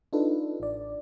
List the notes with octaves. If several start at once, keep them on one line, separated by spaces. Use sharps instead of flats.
D4 D#4 F4 A4 B4
A1 D5